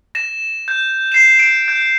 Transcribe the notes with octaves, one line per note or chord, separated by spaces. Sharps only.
A#6 E7
G6
C7 E7
D7
G6